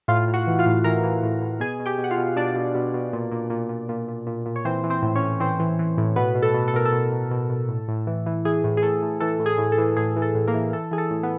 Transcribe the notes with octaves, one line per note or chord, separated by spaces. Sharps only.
A2 F4 F5
A2
F#4 F#5
E3
F4 F5
A2
E3 A#4 A#5
E3
A2
A2
B2 G#4 G#5
B2
G4 G5
B2
F#5
F4 F5
B2
B2 D4 D5
B2
B2
B2
A#2
A#2
A#2
A#2
A#2
A#2
A#2
A#2
C#5
E3 C4 C5
E3
C4 C5
A2
C#4 C#5
A2
E3 C4 C5
E3
E3
A2
B2 B3 B4
B2
A4
B2
A4
B2 A#4
A4
B2
B2
B2
B2
A2
A2
E3
E3
E3 G#4
A2
G#4
A2 A4
A2
E3 A4
A2
G#4
A2
A4
E3
A2 G#4
E3
A4
A2
A#3 A#4
E3
E3 A4
E3 G#4
A4
A2
B3